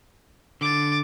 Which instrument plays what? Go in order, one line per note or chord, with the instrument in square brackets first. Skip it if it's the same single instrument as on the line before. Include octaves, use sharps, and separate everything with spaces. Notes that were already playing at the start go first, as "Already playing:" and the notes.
[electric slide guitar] D3 [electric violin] D6 A6